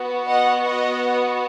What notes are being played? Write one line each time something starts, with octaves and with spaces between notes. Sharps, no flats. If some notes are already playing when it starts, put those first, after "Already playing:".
Already playing: B3 F#4
D#5 F#5
D#5 F#5